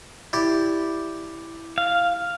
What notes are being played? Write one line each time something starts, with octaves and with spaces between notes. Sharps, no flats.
E4 G4 D5
F5